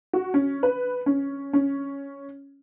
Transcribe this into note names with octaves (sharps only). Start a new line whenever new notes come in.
F#4
C#4
B4
C#4
C#4